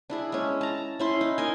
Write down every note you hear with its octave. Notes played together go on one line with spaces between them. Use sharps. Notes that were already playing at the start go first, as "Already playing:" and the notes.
D4 E4 G#4
G#3 C#4
A5 A#5
C#4 E4 C6
D#4
A#4 D#5 G#5